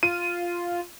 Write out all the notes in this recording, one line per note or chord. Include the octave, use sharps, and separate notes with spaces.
F4 D#7